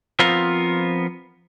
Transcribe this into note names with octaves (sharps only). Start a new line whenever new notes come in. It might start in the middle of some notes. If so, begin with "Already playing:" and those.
F3 B3 C4 F4 A#4